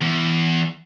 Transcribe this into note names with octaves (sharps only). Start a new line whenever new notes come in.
E2